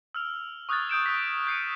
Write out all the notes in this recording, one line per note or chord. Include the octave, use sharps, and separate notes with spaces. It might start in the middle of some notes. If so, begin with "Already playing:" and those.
E6 F6 F7
C#6 D#6 F6 F#6 G#6 A6
D#6 G6 D7 E7
D#6 B6
G6 C7 C#7 D#7